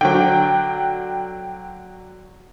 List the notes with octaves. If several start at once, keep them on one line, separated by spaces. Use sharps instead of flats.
D3 F#3 G5